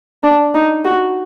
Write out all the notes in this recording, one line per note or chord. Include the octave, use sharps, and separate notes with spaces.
D4
D#4
F#4